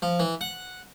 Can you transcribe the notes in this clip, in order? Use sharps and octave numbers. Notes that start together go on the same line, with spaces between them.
F3
E3
F#5